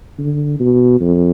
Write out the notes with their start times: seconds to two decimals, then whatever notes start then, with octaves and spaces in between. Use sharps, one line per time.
0.18 D3
0.60 B2
1.01 F2